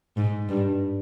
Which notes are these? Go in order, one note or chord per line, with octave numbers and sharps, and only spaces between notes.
G#2
G2